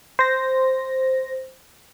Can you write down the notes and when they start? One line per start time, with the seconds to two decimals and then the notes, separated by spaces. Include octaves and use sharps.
0.19 C5 A#6